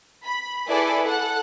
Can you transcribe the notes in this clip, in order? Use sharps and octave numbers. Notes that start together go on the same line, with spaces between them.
B5
E4 G#4 A4 B4 D5
A4 F#5